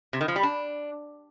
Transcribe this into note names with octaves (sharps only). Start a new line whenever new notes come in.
C3
D#3
F3
G3
D4